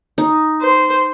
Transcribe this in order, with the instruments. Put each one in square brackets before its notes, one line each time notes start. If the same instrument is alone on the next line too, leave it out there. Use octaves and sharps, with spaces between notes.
[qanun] D#4
[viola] C5